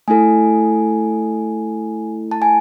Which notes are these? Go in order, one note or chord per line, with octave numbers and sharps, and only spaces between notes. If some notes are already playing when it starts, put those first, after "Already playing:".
A3 E4 A4 G#5
A5
G#5